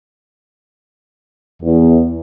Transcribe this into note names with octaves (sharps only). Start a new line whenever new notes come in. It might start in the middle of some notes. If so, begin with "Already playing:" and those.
E2